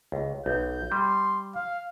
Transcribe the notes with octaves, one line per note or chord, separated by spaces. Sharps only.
C#2
B1 G6
G3 C6
F5